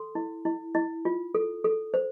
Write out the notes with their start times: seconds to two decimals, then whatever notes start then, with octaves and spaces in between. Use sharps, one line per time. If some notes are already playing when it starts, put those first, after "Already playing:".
Already playing: A4 C6
0.15 E4
0.45 E4
0.75 E4
1.05 F4
1.35 A4
1.64 A4
1.94 C5